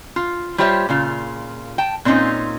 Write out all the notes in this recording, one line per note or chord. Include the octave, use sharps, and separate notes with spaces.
F4
G3 F4 G4 C5 C#5 E5
A#2 C#3 F4
G5 A5
A#2 C4 C#4 D#4 F4